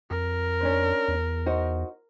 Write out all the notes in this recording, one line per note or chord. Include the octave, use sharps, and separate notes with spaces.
F2 A#4
C#4 D4 C5
E2
D#4 F#4 C5